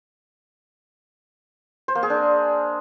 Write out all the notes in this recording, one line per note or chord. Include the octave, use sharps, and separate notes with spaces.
C5
A#3
G#4
D4